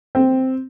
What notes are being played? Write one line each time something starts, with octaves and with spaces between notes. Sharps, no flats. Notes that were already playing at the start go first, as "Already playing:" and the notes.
C4